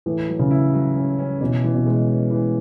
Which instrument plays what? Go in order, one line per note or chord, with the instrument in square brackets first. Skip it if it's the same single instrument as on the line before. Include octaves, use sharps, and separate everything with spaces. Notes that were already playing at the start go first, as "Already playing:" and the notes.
[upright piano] A2 [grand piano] E3
[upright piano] F#3
[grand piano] C#3
[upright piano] E4
F#3
C#4
C#4
[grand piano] B2 [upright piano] E3
[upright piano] E3
[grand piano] B2
[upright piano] G#3
C#4
E3